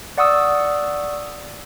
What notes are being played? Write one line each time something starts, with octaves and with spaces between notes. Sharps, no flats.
D5 F#5 C#6 D#6 E6